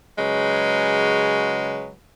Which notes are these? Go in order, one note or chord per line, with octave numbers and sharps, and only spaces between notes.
C#3 F#3 G#3 F#4 B4